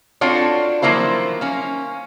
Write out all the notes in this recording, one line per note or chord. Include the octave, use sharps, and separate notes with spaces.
C4 D4 F4 F#4 A4 C#5
D#3 F3 F#3 A#3 E4 C5
A#3 C#4